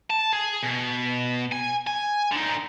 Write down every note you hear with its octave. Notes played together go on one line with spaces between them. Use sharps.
A5
G#4
B2
G#5
G#5
D3 D#4